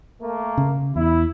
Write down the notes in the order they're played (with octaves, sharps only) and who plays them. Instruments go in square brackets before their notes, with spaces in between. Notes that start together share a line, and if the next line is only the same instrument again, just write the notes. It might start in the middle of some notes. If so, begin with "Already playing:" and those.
[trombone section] A3 A#3
[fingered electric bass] C#3
[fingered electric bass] E2 [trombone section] E4